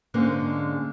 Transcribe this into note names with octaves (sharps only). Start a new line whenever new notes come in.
G#2 D3 G#3 A#3 C#4